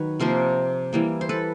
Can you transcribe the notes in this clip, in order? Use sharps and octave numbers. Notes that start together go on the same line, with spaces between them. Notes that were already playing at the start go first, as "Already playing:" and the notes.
Already playing: D#3 F#3 B4 C#5
C3 F3 A#3 A#4 C5
E3 G3 A#3
C5
A4 B4